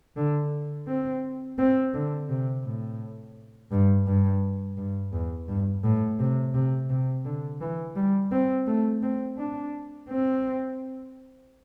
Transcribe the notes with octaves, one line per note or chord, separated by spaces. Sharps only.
D3
C4
C4
D3
C3
A2
G2
G2
G2
E2
G2
A2
C3
C3
C3
D3
E3
G3
C4
A3
C4
D4
C4